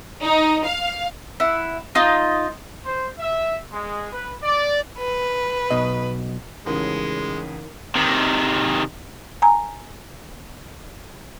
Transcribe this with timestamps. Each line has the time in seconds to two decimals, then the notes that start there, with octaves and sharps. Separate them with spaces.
0.23 D#4
0.66 F5
1.40 E4 F#5
1.95 D#4 F4 D#5
2.85 C5
3.19 E5
3.72 G#3
4.12 B4
4.42 D5
4.98 B4
5.71 B1 B2 D#5
6.66 A1 C#3 G#3 D#4 A#4
7.95 C3 D#3
9.42 G#5 A#5